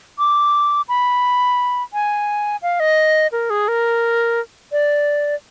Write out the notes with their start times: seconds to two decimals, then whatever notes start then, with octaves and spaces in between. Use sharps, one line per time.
0.19 D6
0.89 B5
1.93 G#5
2.62 F5
2.80 D#5
3.32 A#4
3.50 G#4
3.68 A#4
4.72 D5